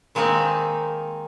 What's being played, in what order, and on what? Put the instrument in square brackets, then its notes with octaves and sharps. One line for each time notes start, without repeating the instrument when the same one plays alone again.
[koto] D#3 G#3 A#3 C4 D#4